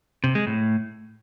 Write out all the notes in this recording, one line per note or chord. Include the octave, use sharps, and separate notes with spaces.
C3
G#3
A2